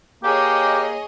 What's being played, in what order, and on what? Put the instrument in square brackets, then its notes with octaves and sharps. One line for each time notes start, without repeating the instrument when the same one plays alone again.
[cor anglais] A#3 [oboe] G4 [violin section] G#4 C#5 D#5